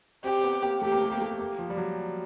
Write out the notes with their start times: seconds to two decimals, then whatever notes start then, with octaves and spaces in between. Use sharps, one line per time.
0.24 C4 G4
0.44 B3
0.63 A#3
0.82 A3 G4
0.92 A#3
1.02 A3
1.12 A#3
1.22 A3
1.39 A#3
1.58 F3
1.70 G3
1.77 F#3